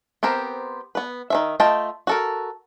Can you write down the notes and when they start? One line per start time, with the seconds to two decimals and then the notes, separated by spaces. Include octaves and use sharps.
0.23 B3 C4 G4 A#4 C5
0.95 B3 B4
1.30 D#3 F3 E5
1.60 A3 F4 D#5 G5 A5
2.07 F#4 A4 A#4